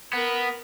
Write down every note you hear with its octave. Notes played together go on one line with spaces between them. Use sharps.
B3 A#4